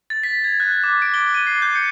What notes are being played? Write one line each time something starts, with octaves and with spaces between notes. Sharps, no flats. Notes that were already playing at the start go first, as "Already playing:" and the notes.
A6
B6
G#6
F#6
D6
D7
G7
D#7
C7
G6
C#7